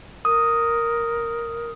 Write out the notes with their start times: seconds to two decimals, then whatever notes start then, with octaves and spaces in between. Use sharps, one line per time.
0.25 A#4 D#6